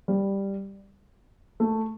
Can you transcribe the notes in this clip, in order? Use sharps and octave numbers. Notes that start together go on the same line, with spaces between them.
G3
A3